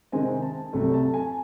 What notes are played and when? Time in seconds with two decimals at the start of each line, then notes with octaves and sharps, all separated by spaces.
0.12 C3 D#3 G#3 C4 G#5
0.42 A5
0.73 C2 C3 F#3 A3
0.94 A5
1.14 G#5